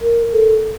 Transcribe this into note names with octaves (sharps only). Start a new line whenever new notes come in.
A#4
A4